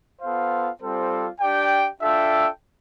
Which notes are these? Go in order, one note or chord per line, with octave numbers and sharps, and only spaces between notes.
B3 F4 A4 C5 F5
G3 C4 F4 A4 C5
D4 G4 D5 G5
D4 F4 A4 E5 G5